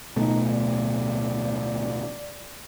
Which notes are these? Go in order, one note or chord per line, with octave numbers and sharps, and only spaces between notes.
D1 B2 A3 D#4
D5